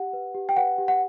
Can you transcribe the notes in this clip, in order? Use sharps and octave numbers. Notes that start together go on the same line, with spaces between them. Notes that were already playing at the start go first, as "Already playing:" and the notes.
Already playing: G4 F#5
B4
G4
G5
B4 F#5
G4
F#5